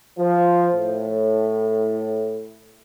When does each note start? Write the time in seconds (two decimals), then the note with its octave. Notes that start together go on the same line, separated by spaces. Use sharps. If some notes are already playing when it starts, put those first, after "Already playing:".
0.18 F3
0.74 A2